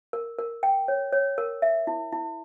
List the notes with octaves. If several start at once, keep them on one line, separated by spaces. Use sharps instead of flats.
A#4
A#4
G5
C#5
C#5
A#4
E5
E4
E4